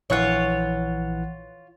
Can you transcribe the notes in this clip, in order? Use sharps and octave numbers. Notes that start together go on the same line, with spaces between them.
A#1 E3 F4 C#5 F#5